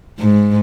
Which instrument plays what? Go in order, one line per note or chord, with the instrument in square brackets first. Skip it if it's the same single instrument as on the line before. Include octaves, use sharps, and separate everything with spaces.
[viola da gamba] G#2